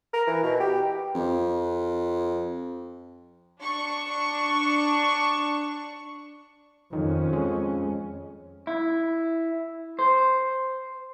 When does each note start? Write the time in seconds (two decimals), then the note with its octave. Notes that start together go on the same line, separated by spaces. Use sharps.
0.14 A#4
0.27 E3
0.43 B2
0.60 G4
1.15 F2
3.63 D4 C#6
6.93 F2 D#3 C#4
7.33 G#3
8.67 E4
9.99 C5